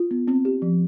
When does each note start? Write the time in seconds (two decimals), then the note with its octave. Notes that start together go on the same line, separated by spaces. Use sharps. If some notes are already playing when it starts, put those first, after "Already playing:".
Already playing: F4
0.11 B3
0.28 C4
0.45 G4
0.62 F3